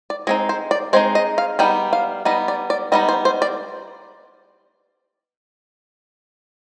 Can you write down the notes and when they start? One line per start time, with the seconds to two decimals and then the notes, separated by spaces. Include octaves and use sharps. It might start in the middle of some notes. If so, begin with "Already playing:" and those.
0.10 D5
0.27 G#3 C4 D#4 D#5
0.49 C5
0.71 D5
0.93 G#3 C4 D#4 C5
1.15 D#5
1.38 F5
1.59 G3 B3 D#4 G5
1.93 F5
2.25 G3 B3 D#4 D#5
2.48 D5
2.70 D5
2.92 G3 B3 D#4 D#5
3.09 C5
3.25 C5
3.42 D5